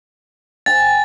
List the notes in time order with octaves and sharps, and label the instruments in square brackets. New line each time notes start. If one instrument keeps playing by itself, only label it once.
[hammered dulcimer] G5 G#5 [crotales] A6